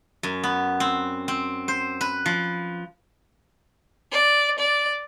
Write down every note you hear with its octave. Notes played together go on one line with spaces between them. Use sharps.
F#2
B3
C4
C4
C5
B4
F3
D5
D5